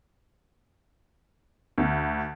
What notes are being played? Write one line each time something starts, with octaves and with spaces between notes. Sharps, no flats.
D2